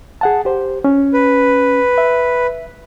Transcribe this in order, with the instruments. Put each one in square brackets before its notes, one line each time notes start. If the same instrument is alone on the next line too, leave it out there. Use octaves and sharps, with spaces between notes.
[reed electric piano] G#4 F#5 A5
G4 C5
C#4
[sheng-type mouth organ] B4
[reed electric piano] E5